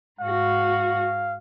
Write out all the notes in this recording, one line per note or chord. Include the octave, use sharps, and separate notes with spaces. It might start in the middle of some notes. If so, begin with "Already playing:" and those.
G#2 F#4 F5